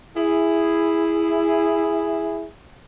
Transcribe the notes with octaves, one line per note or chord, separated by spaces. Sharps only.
E4 G#4